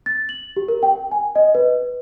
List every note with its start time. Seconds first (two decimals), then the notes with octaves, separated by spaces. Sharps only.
0.06 A6
0.29 F#7
0.56 G4
0.68 A#4
0.83 G5
1.12 G#5
1.36 D#5
1.55 B4